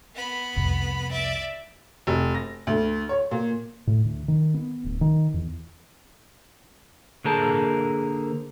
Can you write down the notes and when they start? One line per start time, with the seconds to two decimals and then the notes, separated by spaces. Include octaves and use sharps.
0.15 B3 B5
0.56 C2 F2
1.11 D5 E5
2.07 F1
2.35 A#6
2.67 D2
3.09 C#5
3.31 A#2
3.87 A2
4.04 D2
4.28 D#3
4.54 B3
4.84 D1
5.01 D#3
5.34 E2
7.24 D3 A#3 G#4 A#4 C5 A5